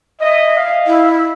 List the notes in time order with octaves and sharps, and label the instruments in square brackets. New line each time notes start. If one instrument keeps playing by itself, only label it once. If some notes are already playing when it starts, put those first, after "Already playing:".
[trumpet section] D#5 [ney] E5
[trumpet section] D#5 F5
[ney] E4